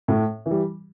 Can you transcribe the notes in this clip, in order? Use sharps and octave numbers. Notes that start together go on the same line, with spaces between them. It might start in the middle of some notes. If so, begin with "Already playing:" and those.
A2
E3
G3